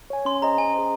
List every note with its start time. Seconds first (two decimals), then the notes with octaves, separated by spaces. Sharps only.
0.10 C#5 G#5
0.25 C#4 C6
0.42 G#4 C5 D#5 A#5
0.58 C#4 G#5
0.74 G#4 C5 D#5